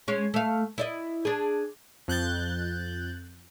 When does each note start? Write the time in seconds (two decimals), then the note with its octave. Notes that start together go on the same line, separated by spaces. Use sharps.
0.08 G#3 C#4
0.34 A3 F5
0.78 E4 D5 D#5
1.25 D4 G#4
2.08 F2 F#6 G6 A6